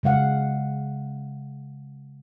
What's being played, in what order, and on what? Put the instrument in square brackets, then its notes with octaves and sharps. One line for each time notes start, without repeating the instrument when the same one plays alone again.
[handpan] C#3 G#3 F5 F#5